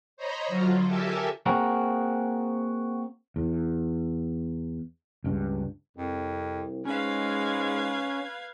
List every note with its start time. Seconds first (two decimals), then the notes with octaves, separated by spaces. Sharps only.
0.17 C5 C#5 D#5 A#5 B5
0.47 D3 F#3 F4
0.84 G4 A4 A#4 E5 G#5 A5
1.46 A#3 C4 F#4 G#4 A#4
3.36 E2
5.24 C#2 G2
5.97 C2 F2
6.85 G#2 G#3 C#4 B4 F5 G#6